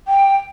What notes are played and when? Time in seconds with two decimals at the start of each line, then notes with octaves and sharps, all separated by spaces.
0.07 G5